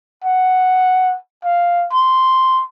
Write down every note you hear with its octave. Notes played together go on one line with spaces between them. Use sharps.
F#5
F5
C6